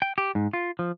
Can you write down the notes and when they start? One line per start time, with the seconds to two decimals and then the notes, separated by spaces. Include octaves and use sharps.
0.02 G5
0.18 G4
0.35 G#2
0.53 F4
0.79 F3